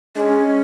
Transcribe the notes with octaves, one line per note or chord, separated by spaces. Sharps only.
G#3 C#4 D4